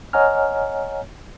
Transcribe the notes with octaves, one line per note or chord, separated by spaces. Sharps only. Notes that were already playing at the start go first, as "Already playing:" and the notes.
C#5 D#5 F#5 G#5 A#5 F6